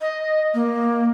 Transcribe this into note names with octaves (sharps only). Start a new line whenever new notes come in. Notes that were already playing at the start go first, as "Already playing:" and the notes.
D#5
A#3